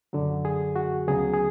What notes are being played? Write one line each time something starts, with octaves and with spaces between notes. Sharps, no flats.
F#2 D3 F#3
G#4
F#4
D2 C#3 F#3 B3 G#4
G#4